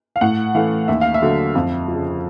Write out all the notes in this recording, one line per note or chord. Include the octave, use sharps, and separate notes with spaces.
F5
A2 F#5
E3 A3 F5
D#2 E5
F5
E5
D3 F#3
F2 F5
C#3 F3